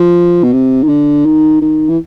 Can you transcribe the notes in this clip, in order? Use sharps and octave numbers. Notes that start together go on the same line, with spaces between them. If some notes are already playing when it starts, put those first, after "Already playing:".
Already playing: F3
B2
C3
D#3
D3
D#3
D#3
E3